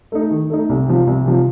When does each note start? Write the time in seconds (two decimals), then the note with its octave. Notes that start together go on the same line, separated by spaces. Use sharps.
0.12 A3 D#4
0.31 D#3
0.50 A3 D#4
0.69 C2
0.88 C3 F3
1.07 C2
1.26 C3 F3